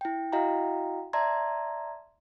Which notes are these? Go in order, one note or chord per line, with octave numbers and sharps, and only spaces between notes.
E4 G5
E4 F#4 D#5 F5 G5 A#5
D5 E5 A5 A#5 C6 G#6